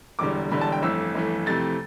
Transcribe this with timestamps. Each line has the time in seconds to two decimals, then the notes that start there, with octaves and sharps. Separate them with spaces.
0.19 E1 E2 D3 G3 D6
0.51 E1 E2 D3 G3 B5
0.61 A5
0.72 G5
0.82 G1 F2 E3 A3 E6
1.15 G1 F2 E3 A3
1.46 F2 C3 E3 A3 A6